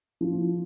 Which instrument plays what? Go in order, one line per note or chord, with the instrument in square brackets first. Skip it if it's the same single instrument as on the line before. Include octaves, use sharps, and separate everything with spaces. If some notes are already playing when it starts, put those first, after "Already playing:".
[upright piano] F3